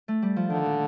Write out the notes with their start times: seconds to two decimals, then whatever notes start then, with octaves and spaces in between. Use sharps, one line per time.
0.08 A3
0.22 G3
0.36 F3
0.50 D3 D#3
0.66 A#2